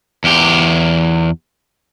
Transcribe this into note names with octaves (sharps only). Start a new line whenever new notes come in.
E2 G4